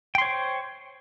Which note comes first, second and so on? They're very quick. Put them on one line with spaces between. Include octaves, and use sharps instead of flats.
G5 C6 C#5 C5